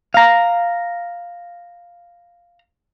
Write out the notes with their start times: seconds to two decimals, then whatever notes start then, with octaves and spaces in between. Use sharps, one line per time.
0.14 F5 A#5